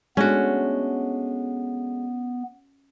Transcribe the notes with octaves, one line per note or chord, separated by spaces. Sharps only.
G#3 A3 B3 C#4 D4 F#4